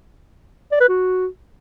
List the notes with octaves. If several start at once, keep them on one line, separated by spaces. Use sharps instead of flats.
D5
B4
F#4